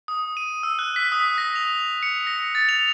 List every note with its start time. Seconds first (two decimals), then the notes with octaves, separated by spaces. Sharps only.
0.08 D#6
0.37 D#7
0.63 E6
0.79 F#6
0.96 B6
1.12 D#6
1.38 A#6
1.56 F7
2.03 C#7
2.27 A#6
2.55 A6
2.69 F7